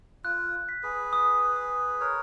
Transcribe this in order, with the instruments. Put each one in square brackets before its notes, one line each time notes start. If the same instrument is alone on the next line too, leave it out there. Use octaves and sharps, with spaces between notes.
[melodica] F4 [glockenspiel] F#6
[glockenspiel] B6
[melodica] G#4 B4
[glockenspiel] D#6
D#6
[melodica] A#4 C#5 [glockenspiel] F#6